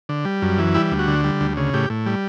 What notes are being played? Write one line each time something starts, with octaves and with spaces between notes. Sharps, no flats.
D3
G3
F#2
E3
G3 E4
D2
F#4
D3
G3
D2
C#3
A2 G4
A2
G3